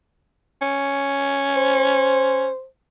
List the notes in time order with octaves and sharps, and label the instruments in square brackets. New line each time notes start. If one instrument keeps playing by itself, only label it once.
[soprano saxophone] C#4
[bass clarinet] C5